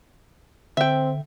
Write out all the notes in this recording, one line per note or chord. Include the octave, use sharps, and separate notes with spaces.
D3 C4 E5 G5